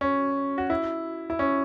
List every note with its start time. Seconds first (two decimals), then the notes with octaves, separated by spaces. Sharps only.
0.01 C#4
0.58 F#4
0.70 E4
1.30 E4
1.39 C#4